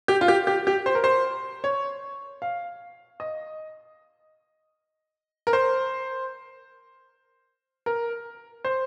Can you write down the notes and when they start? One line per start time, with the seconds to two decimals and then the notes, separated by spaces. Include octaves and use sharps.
0.08 G4
0.21 F4
0.28 G4
0.47 G4
0.67 G4
0.86 C5
0.95 A#4
1.04 C5
1.64 C#5
2.42 F5
3.20 D#5
5.47 A#4
5.53 C5
7.86 A#4
8.64 C5